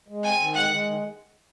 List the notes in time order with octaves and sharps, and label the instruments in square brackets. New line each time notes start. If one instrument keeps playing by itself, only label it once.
[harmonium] G#3
[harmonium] C4 [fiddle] G#5
[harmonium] D#3
[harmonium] G#3 [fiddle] F#5
[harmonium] G#3
D#3